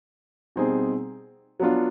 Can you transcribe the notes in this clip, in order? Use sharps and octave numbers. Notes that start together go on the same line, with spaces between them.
B2 G3 C4 D#4 G#4
F#3 B3 D4 F4